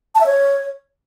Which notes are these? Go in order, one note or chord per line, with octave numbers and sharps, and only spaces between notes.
A5
E5
C#5